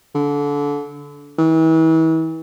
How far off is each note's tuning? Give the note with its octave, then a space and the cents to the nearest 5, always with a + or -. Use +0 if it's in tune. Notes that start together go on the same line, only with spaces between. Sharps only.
D3 -25
E3 -35